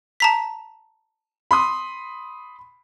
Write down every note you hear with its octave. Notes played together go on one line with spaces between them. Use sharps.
A5 A#5 B6
B5 C6 D#6